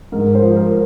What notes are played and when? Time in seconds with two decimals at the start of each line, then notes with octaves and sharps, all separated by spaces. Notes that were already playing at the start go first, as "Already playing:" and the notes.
0.12 G#2 A#4
0.35 C5
0.42 F3
0.56 A#4